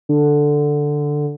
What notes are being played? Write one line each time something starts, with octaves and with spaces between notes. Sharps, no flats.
D3